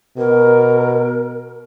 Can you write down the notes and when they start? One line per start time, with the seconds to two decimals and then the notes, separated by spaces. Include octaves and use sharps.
0.18 B2 A#4